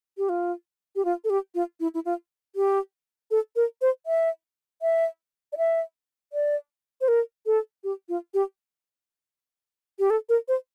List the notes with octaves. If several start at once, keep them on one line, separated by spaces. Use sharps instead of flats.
G4
F4
G4
F4
A4
G4
F4
E4
E4
F4
G4
A4
A#4
C5
E5
E5
D5
E5
D5
C5
A#4
A4
G4
F4
G4
G4
A4
A#4
C5